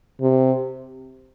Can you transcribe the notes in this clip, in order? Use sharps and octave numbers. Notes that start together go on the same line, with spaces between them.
C3